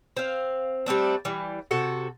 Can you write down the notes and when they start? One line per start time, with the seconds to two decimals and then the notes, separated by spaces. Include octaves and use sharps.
0.17 C4 F5
0.86 G3 A3 C4 D4
1.25 E3 G3
1.71 C3 F#4 A4